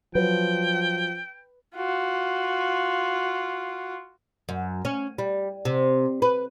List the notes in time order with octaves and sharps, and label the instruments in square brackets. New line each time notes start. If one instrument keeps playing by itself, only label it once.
[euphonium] F3 [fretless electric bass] F#3 [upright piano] B4 [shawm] G5
[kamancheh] F4 F#4
[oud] F#2
C#4
G3
C3
B4